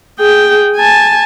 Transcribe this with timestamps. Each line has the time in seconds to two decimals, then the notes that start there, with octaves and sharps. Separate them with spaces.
0.20 G#4 G5
0.76 G#5 A5